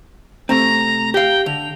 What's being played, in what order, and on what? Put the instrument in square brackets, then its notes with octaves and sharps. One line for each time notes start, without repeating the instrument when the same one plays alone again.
[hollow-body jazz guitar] C3 A3 C4 [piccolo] A#5
[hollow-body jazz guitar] G4 F5 [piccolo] G5
[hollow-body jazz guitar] D3 [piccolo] F7